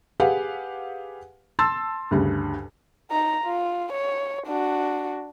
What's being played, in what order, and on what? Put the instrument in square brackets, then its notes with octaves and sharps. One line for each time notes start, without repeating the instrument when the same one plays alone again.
[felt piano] G4 G#4 B4 F5 F#5
A5 C6 E6 A6
D2 G2 C#3
[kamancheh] D#4 A#5
F4
C#5
D4 F#4